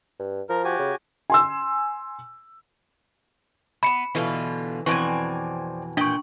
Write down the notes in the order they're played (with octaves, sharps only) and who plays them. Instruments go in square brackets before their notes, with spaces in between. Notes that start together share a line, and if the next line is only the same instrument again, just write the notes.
[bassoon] G2
[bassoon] F3 [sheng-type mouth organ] A#4
[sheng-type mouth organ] F#4 G4 G#5
[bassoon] C#3
[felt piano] G#5 C6 E6
[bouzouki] A3 B3 [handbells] B5 C#7
[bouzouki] B2 D3 F4 [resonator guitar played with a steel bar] E3
[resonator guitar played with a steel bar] F2 B2 E3 [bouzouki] C4 D5 G#5 [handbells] C#6
[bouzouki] A#2 G5 [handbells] D4 C#6